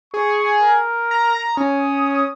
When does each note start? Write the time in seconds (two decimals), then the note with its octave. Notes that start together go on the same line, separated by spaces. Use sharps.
0.14 G#4 C#6
0.61 A#4
1.11 A#5
1.57 C#4 D#6